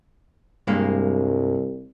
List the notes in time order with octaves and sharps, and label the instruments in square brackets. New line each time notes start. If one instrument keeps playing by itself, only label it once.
[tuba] C2 [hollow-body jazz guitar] G2 G#3 A#3